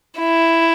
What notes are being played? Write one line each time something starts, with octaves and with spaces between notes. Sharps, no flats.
E4